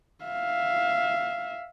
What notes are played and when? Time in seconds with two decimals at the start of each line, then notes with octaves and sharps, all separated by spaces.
0.24 E5 F5